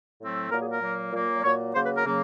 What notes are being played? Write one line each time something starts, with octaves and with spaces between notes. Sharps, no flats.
A2 F#3 A3 C4
A#2 F#3 A#3 A#4
G#4
A#4
A#2 F#3 A#3
A#2 F#3 A#3
A#2 F#3 A#3 C#5
C#3 F#3 A#3 C5
B4
A#4
C#3 F#3 A#3